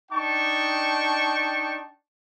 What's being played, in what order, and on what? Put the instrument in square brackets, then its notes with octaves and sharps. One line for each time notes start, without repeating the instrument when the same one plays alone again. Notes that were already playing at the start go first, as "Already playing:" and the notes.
[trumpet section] D4 D#4 G5 A5 C#6